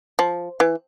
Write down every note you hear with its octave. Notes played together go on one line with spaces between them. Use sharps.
F3
E3